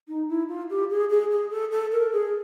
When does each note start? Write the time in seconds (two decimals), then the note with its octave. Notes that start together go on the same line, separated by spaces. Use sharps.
0.08 D#4
0.29 E4
0.49 F4
0.70 G4
0.90 G#4
1.10 G#4
1.31 G#4
1.51 A4
1.72 A4
1.92 A#4
2.13 G#4